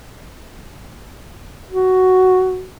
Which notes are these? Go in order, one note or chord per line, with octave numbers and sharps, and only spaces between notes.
F#4